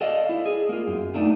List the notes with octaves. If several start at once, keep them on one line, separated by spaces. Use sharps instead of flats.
A4 D5 D#5 F5
E4
G#4
A#3 F4
F#2
A3 A#3 D4 D#4